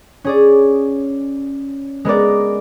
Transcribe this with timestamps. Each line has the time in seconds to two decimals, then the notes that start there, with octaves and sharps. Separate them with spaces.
0.24 C#4 G#4 D5
2.05 G#3 B3 A#4 D5